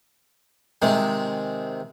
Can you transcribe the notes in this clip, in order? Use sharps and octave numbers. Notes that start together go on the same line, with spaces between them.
C3 D#3 G#3